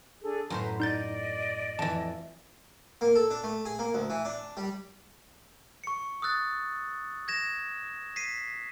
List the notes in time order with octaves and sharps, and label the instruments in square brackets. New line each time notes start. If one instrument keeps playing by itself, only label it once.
[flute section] D4 G#4 A4
[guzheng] F#2 A2 C5 [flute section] B4 A#5 C6
[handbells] D#4 G6 A6 [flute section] D5 D#5
[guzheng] F2 E3 [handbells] A5
[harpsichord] A#3
A4
D4
A3
G#4
A#3
D2
E3
D4
G3
[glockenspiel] C#6 C#7
D#6 E6 F#6 A6
G#6 A#6 E7
B6 C7 D#7